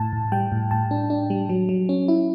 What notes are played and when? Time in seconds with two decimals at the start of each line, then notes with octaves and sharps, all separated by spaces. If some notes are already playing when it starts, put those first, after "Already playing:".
Already playing: A2 A5
0.13 A2
0.32 G3 G5
0.52 A2
0.71 A2 A5
0.91 D4
1.10 D4
1.30 G3
1.49 F#3
1.69 F#3
1.89 C#4
2.08 E4